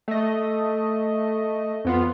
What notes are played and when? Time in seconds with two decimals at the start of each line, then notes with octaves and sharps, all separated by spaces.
0.08 A3 D#5
1.85 F2 B3 F4